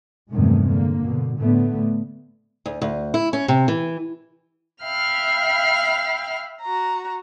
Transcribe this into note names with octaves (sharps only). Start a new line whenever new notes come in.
E2 G2 C3 D#3 G#3 A3
D3 A#3
B2 D3
A2 D3 A3 B3
D2
D2
E4
C#4
C3
E3
E5 F5 G5 B5 F6
F#4 A#5